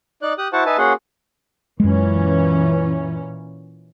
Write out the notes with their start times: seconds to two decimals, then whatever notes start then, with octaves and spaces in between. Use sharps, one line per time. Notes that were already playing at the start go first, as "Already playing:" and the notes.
0.22 D#4 D5 F#6
0.38 G4 D#6 F#6
0.53 E4 F#4 C5 F#5 A5 C#6
0.66 D#4 B4 E5 G#5 A5
0.78 A#3 C#4 F#4 G#4 F#5 C6
1.80 F#2 A#2 E3 G#3 C#4